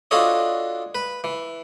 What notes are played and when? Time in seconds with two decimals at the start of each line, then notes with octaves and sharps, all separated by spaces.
0.11 D4 F4 F#4 A4 C#5 D#5
0.95 B4
1.24 E3